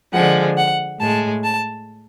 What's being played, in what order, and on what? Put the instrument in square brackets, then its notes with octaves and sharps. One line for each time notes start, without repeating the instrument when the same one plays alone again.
[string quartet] D3 F3 G#3 F#5
F#5
A2 G#3 A5
A5